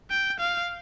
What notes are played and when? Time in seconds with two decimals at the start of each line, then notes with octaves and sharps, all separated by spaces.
0.10 G5
0.40 F5